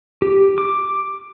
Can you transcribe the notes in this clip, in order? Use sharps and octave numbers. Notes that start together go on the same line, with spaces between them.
G4
D6